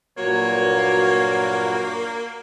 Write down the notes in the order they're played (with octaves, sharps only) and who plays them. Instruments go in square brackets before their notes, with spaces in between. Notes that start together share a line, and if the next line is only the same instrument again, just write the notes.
[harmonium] G2 A#2 F#3 [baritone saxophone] A#3 [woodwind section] F#4 [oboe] C#5